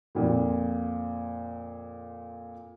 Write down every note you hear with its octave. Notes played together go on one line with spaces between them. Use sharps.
F2 A#2